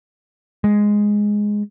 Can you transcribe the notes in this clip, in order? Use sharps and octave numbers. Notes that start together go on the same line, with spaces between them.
G#3